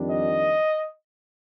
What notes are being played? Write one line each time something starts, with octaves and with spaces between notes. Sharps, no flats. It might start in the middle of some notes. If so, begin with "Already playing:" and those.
Already playing: F2 D#3 G3 D4
D#5